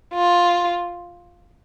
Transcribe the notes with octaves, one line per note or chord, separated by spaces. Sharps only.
F4